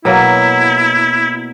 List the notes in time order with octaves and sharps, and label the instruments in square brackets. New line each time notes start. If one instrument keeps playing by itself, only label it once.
[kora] B2 F#3 A#3 [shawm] E4